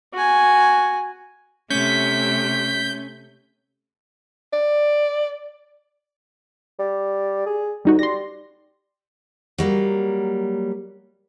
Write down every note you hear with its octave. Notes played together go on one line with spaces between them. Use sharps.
F#4 G#5
C3 A3 C#4 G6 B6
D5
G3
G#4
D2 G3 D#4 F#4
G3 C6 A#6
F#3 G3 A#3